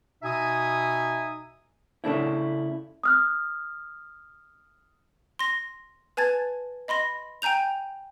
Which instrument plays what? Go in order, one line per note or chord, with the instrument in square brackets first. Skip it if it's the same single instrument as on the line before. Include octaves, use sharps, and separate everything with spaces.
[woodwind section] B2 D#4 E5 G#5 D#6
[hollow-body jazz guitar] C#3 A3 D4 E4
[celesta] D#6 F6 F#6
[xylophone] C6 A#6
B4 G#5 A5 G#6 A6
D#5 B5 C6 A#6
G5 G#5 A#5 G6 F7